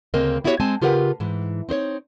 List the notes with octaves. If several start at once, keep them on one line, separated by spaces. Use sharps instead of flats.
D2 C#3 A#3 C4 A#4 D#5
B3 E4 F#4 G4 A#4 C#5
G#3 C4 G#5 A5
C#3 F4 G4 A#4 B4 F#5
G#2 E3
C4 D#4 C5 C#5